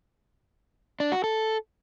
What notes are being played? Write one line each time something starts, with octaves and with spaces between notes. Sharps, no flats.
D4
F#4
A4